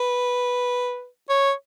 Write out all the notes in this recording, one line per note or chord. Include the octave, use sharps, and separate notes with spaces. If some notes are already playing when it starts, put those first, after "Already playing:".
Already playing: B4
C#5